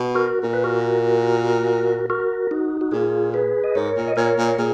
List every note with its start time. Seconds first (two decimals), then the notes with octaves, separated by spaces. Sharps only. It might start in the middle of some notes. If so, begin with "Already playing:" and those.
Already playing: B2
0.15 F#4 A#4
0.43 A#2 A#4
0.53 B4
0.64 F#4 A#4
2.10 F#4 A#4
2.51 D#4 F#4
2.81 F#4
2.92 A#2 F4 G#4
3.34 G#4 B4
3.64 D#5
3.75 G#2 A#4 C#5
3.96 A#2
4.08 D#5
4.17 A#2 A#4 C#5
4.38 A#2
4.59 A#2 G#4